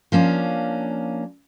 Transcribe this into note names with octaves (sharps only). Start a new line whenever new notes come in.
F3 A#3 C#4 D4